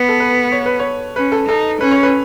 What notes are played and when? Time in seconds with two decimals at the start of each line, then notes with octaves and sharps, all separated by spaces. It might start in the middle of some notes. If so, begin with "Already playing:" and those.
Already playing: B3 B4
0.09 A4
0.20 B4
0.52 C#5
0.66 B4
0.80 C#5
1.16 C#4 B4
1.32 A4
1.48 D#4 A4
1.81 C#4 B4
1.91 C#5
2.03 B4